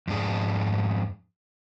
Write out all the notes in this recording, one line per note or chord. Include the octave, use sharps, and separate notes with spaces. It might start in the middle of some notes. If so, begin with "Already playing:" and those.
F2 G#2 D4 G#4